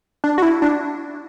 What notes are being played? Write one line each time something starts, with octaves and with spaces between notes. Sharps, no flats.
D4
F#4
E4
D4